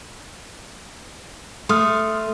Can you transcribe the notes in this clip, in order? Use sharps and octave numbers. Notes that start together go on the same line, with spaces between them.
A3 C6 D#6 F6